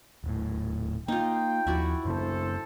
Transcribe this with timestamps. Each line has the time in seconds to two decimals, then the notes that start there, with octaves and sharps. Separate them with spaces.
0.24 D#1 A2
1.08 A#3 D#4 F4 G5
1.67 D#2 F3 E4 F#4 D5
2.05 F#2 C#3 B3 A4 C5